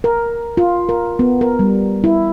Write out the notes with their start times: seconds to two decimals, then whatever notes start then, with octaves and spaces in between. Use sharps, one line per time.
0.04 A#4
0.57 F4
0.89 A#4
1.19 B3
1.41 A#4
1.59 G3
2.04 E4